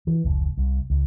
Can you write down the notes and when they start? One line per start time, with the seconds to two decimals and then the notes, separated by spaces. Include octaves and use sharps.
0.07 E3
0.24 F1 C#2
0.58 C2
0.90 C#2